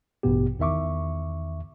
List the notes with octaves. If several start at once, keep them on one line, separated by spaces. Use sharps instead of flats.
A1 G2 B2 B3 G4
E2 D#3 E5 C#6 D6